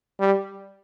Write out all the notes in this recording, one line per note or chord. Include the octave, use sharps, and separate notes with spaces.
G3